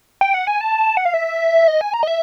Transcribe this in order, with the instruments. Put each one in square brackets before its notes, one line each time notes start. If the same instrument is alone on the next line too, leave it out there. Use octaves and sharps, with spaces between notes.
[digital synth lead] G5
F#5
G#5
A5
F#5
F5
E5
D#5
G#5
A#5
D#5
E5